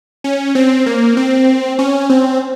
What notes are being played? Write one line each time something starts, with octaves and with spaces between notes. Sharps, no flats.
C#4
C4
A#3
C4
C#4
C4